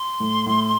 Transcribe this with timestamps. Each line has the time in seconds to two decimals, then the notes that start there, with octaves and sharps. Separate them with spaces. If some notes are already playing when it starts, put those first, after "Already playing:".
Already playing: C6
0.20 A2
0.46 A2